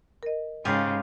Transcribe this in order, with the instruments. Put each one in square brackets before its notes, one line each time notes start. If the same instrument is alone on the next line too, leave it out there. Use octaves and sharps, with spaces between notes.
[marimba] A#4 D#5
[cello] G#2 C#3 [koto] F4 G4 G#4